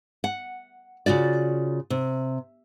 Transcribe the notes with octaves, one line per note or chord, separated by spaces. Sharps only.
F#5
C#3 F4 F#4 D5
C3